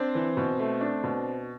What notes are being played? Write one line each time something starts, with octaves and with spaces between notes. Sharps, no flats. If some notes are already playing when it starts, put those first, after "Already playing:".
Already playing: C4 D4 C5
E3
B2
A3
D4
B2